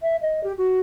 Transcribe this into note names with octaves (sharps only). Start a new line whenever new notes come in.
E5
D#5
G4
F#4